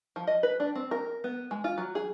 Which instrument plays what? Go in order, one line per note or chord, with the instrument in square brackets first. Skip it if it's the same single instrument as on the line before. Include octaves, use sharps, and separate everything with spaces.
[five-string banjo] F3
D#5
B4
D4
C4
A#4
B3
G#3
F4
F#3
G#4